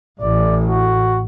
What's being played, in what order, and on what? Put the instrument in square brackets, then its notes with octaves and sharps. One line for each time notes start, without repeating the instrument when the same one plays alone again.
[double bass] A1 A2 [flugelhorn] D5
[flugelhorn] F#4